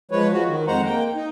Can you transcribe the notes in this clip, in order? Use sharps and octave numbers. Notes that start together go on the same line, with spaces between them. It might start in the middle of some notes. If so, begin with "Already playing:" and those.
F3 G#3 B4 C#5
F3 F#4
D#3
F2 G#3 C5 F#5 A#5
A#3 G5
D#4